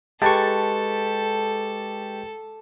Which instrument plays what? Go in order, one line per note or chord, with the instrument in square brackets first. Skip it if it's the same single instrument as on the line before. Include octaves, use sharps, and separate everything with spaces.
[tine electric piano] G#3 B4 C#6 [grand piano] G4 [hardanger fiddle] A4 [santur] A5